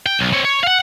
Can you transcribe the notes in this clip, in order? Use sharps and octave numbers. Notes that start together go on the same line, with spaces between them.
G5
B1
C4 C#5
C#5
F5 F#5